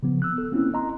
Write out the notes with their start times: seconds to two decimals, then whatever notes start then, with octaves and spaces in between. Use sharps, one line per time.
0.03 C#3 F3 B3
0.22 E6 F#6
0.38 A4
0.52 A#3 C4 C#4 E4
0.74 D#5 A#5 C6